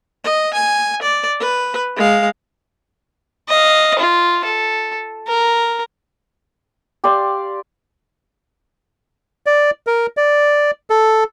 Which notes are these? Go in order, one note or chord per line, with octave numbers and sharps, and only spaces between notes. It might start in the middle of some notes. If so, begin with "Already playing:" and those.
D#5
G#5
D5
B4
G#3 F5
D#5 F5
F4
A4
A#4
G4 D5 F5 C6
D5
A#4
D5
A4